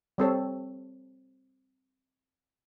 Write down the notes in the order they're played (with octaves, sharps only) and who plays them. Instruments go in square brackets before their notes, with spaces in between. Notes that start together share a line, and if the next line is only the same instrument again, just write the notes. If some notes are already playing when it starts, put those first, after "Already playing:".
[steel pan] G3 C4 A4 C#5